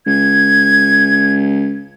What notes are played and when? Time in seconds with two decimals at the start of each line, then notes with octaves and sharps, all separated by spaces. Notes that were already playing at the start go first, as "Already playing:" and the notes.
0.07 C#2 G#6